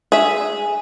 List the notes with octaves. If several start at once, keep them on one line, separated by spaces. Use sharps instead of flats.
G#4 E5